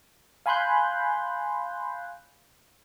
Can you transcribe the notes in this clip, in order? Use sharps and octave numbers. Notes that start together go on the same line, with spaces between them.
F5 G#5 B5 C6 F#6 G6